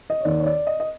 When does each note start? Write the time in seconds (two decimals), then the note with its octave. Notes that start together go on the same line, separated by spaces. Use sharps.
0.10 D#5
0.21 C#5
0.25 D#2 D#3 D5
0.40 C#5
0.46 D5
0.67 D#5
0.80 D#5